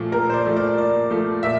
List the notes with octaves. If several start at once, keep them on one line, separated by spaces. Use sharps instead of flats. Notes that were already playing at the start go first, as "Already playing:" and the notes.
Already playing: A#2 F3 A3
A#2 A#4
C5
D5
F3 A3
D5
A#2 D5
F3 A3
A#2 E5